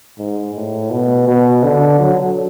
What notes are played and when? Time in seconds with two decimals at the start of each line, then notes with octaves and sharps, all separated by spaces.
0.18 G#2
0.55 A2
0.90 B2
1.28 B2
1.63 D3
2.00 F#3